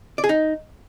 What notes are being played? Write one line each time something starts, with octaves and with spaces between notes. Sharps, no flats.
D5
G#4
D#4